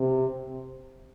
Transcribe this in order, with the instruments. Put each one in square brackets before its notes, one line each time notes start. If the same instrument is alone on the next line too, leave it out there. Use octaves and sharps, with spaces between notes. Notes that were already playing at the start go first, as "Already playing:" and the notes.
Already playing: [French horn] C3